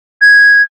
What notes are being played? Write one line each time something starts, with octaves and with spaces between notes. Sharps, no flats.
G#6